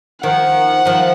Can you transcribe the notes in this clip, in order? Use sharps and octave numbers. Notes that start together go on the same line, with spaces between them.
D#3 F3 F#5
D#3 F3